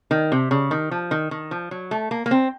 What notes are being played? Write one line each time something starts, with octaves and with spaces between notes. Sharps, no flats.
D#3
C3
C#3
D#3
F3
D#3
D#3
F3
F#3
A3
A#3
A#3
C4